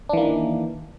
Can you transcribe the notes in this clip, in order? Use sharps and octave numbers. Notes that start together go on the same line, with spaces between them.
D#3 E3 A#3 D4